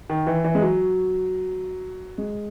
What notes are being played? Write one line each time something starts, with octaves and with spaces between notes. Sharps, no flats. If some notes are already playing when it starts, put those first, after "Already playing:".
D#3
E3
E3
G#3
F#3
G#3